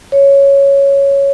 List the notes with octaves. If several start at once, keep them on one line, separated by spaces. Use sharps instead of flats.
C#5